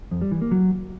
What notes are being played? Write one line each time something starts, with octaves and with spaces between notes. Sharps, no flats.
F2
G3
E3
A#3
F#3